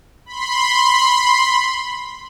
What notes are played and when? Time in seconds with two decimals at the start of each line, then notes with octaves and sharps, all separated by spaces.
0.26 B5 C6